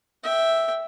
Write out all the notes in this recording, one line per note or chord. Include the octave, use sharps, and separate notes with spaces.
E5 G5